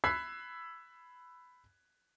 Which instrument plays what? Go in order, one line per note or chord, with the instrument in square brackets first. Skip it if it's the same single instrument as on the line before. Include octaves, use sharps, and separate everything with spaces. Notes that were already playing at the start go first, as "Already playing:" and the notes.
[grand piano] B5 E6 F#6 G#6 B6 C7